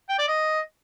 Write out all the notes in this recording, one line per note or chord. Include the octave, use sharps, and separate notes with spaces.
G5
D5
D#5